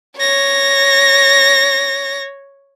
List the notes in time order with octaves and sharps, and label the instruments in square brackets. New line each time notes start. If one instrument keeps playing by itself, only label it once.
[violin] C#5 A#6